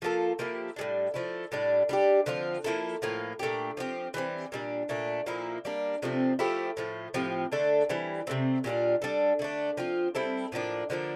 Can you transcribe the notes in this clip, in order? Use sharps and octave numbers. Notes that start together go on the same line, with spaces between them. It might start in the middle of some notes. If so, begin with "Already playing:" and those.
F3 A#3 F4 A4
F3 A#3 E4 G4
A2 E3 G3 D4
F3 A3 E4
A2 G3 D4
G3 D4 G4
D3 F3 C4 F4
F3 A#3 E4 A4
A2 F3 A#3 F4
A#2 A3 D4 G4
F3 A3 C4 G4
E3 G3 C4
A#2 G3 D4
A#2 A3 D4
A#2 F3 A#3 E4
G3 A#3 D4
C3 F3 A3 C4
F3 A3 E4 G4
A2 F3 A3
A2 F3 C4 G4
D3 A3 D4 A4
E3 G3 C4 E4
C3 E3 A3 C4
A#2 G3 D4 F4
G3 D4 A4
D3 A3 D4
F3 C4 F4
G3 C4 E4 A4
A2 F3 A#3 D4
D3 F3 A#3 D4